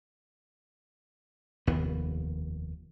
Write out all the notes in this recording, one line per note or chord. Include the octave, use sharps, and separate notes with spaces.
F1 D#2 B3